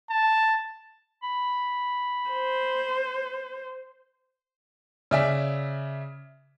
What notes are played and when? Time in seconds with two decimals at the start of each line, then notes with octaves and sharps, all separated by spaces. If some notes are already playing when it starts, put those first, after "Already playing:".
0.10 A5
1.23 B5
2.30 C5
5.11 C#3 D5 E5 G#5 B6